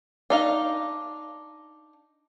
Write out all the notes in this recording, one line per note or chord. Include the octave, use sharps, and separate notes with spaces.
D4 D#4 F5